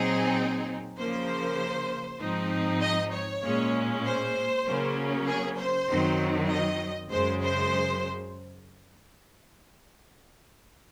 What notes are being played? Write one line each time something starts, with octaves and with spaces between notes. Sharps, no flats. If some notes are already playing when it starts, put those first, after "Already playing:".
Already playing: A#2 F#3 C4 D#4 G#4
C#3 F3 A#3 C5
G#2 F3 C4 D#4
D#5
C#5
A#2 G#3 C#4
C5
C#3 F#3 A#3 C#4
G#4
C5
F#2 D#3 F#3 C4
D#5
F#2 C#3 G#3 C5
C5